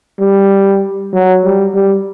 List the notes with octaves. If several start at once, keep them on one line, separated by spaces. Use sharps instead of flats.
G3
F#3
G3
G3